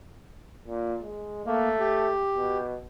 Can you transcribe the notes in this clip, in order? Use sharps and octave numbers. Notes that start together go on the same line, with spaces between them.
A#2
G#3
A3 A#3
G4
B2